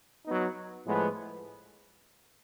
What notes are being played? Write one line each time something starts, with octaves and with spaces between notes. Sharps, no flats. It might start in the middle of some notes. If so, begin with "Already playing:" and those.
F#3 B3 D#4
A2 F3 G#3 B3